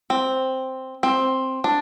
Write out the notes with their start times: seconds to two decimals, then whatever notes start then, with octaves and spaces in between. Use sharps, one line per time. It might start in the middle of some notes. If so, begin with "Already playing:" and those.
0.10 C4
1.03 C4
1.64 D4